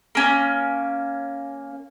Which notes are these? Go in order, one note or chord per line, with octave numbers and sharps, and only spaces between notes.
A#3 C#4